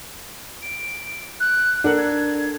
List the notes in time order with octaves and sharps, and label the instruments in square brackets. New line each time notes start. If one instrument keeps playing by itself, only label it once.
[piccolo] D7
F#6
[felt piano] D4 A4 A#4 [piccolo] F#5
[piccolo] G#6